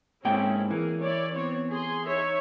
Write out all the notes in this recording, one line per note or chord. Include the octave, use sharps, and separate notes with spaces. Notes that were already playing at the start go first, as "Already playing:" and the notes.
G#2 A#3 C4 C#4 E4 G5
E3 A#3 G#4
E4 C#5 D5
B3 C4 C#5
G#4 C6
D#4 C#5 E5